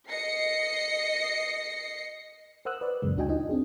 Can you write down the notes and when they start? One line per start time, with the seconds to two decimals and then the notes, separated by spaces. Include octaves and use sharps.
0.10 D#5 A#6 C7 C#7
2.65 A#4 C5 F#5 D#6 E6 F#6
2.81 B4 D5
3.02 F#2 A#2 C#3 G#3
3.17 D2 D4 F#4 D#5 G5 G#5
3.29 D#4 F4 D#5
3.49 C4 D4 G#4